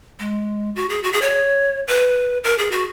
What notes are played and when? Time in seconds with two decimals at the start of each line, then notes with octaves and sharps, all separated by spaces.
0.20 G#3
0.76 F#4
0.89 G#4
1.03 F#4
1.13 G#4
1.22 C#5
1.87 B4
2.44 A#4
2.58 G#4
2.72 F#4